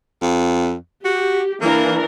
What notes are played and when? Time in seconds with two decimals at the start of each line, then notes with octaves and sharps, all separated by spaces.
0.22 F2
1.05 F#4 G4
1.61 E3 A#3 D4 A#4